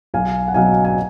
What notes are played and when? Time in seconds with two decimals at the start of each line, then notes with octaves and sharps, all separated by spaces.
0.14 B1 F5 G#5
0.48 F#5
0.54 B2 F#3 F5 G#5
0.85 G#5